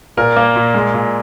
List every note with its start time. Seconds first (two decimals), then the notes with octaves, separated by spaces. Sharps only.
0.17 A#2 A#4
0.37 A#3
0.56 A#2
0.74 G#3
0.94 A#2